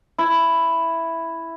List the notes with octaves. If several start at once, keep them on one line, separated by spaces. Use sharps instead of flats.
E4